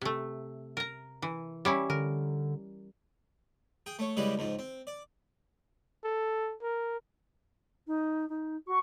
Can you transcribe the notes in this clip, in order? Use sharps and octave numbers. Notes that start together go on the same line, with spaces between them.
C3 A3
A#4 A#5
E3
G3 C#4 E4
D3 A#4
G#4 G5
A3 C#5
C#3 E3 G3 G#3 G4 B4
C#2 G#2 F3
C4
D5
A4
A#4
D#4
D#4
F#4 C#6